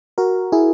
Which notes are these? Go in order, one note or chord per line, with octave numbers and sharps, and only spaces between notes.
F#4 A#4
E4 G#4